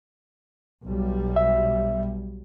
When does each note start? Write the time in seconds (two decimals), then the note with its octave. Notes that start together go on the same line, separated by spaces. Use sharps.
0.84 B1 G3
1.36 E5